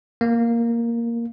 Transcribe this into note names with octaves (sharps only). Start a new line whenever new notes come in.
A#3